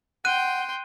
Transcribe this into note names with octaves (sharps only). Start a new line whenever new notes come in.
F#5 G5 C6 F#6 D#7